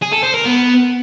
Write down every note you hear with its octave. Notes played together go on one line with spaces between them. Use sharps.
G#4
A4
C5
A#4
B3